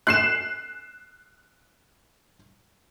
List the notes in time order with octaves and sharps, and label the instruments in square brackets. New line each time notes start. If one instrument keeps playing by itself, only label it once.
[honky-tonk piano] F#6 C7 E7